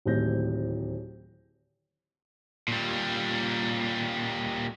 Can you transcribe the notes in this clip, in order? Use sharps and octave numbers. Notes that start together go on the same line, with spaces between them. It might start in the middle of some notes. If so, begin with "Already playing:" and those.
D1 D#2 A2 C4 G6 A#6
A#2 G3